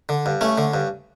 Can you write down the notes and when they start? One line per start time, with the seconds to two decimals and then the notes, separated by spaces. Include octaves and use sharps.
0.09 D3
0.26 G2
0.41 A3 C#4
0.58 D3
0.74 G2